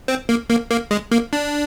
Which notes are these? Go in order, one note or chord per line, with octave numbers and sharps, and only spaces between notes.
C4
A#3
A#3
A#3
G#3
A#3
D4